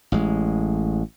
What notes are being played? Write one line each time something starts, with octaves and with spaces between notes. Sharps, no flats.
A1 G#3